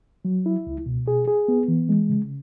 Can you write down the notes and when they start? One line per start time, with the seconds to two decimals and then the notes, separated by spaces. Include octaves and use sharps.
0.25 F#3
0.46 E4
0.67 C#2
0.86 B2
1.08 G#4
1.28 G#4
1.48 B3
1.68 E3
1.89 G#3
2.10 C#3